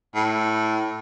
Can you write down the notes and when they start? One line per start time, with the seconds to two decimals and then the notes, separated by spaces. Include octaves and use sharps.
0.15 A2